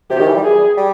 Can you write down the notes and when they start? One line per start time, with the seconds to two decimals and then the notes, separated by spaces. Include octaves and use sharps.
0.10 C3 G4
0.19 D#3
0.27 E3
0.35 G3
0.44 G#4
0.77 G3